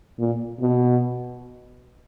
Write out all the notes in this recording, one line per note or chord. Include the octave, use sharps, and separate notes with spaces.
A#2
B2